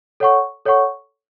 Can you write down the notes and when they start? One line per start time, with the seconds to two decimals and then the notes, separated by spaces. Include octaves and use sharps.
0.20 A4 C#5 F#5 C#6
0.65 A4 C#5 F#5 C#6